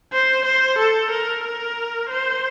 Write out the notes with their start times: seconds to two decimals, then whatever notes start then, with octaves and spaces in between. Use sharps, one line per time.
0.13 C5
0.45 C5
0.78 A4
1.11 A#4
1.44 A#4
2.09 C5